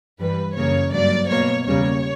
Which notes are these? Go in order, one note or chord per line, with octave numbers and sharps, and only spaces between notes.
G2 E3 G3 B4
F#2 C#3 E3 A#3 C#5
G2 F#3 A#3 D5
B2 A#3 C#5
E2 C#3 G3 A#3 C#5